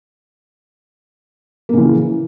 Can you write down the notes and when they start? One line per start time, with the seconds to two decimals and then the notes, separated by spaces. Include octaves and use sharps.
1.69 A#3
1.73 C#3
1.78 E3